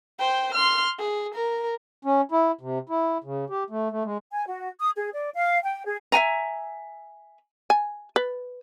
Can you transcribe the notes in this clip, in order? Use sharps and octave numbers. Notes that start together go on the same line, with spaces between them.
C5 G5
C6 F6
G#4
A#4
C#4
E4
C3
E4
C#3
G4
A3
A3
G#3
G#5
F#4
D#6
G#4
D5
F5
G5
G#4
E5 F#5 G#5 A#5
G#5
B4